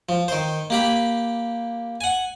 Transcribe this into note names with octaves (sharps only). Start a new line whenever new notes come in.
F3
D#3 C5
A#3 G4 B5
F#5 G#5